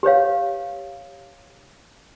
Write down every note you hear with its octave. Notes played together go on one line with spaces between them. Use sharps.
G4 B4 C#5 F5